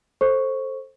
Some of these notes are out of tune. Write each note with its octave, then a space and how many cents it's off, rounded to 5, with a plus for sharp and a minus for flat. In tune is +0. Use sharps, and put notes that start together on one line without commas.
A4 +0 C5 +15 C#6 +0